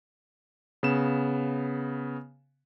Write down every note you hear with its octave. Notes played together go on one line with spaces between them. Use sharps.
C#3 B3 E7